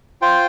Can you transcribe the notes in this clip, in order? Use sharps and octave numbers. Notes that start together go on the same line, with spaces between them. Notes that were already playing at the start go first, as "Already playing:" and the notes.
F4 C5 G5